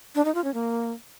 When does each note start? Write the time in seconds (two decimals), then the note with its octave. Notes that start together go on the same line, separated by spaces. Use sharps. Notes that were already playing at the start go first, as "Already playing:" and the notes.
0.15 D4
0.25 D#4
0.35 F4
0.44 C#4
0.54 A#3